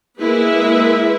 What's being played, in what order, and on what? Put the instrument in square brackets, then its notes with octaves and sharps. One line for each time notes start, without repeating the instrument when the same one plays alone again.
[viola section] G#3 A#3 E4 B4 E5